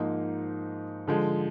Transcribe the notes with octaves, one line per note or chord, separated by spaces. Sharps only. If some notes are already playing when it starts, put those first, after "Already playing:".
Already playing: G#2 F3 A#3 D#4
D3 F3 G#3